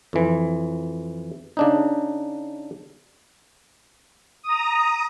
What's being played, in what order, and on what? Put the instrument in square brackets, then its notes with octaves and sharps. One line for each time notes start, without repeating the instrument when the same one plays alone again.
[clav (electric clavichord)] F2 E3
C#3 D4 D#4
[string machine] A#5 D#6